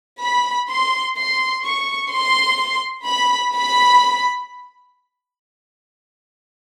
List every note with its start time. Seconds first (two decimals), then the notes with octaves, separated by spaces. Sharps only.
0.22 B5
0.70 C6
1.18 C6
1.64 C#6
2.13 C6
3.06 B5
3.54 B5